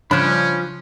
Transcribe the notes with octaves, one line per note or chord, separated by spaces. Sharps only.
C#3 F3 C#4 D4 B5 F#6 G6